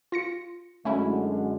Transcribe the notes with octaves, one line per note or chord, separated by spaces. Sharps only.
F4 A#6 C#7
F#2 D3 G#3 A3 C#4 E4